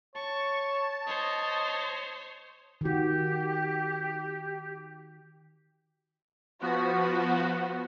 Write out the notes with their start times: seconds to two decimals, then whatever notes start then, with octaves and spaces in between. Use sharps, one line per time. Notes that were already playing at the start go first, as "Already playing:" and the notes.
0.16 C#5 A5 C#6
1.07 C5 C#5 D#5
2.81 D#3 F#4 G4
6.61 F3 B3 F#4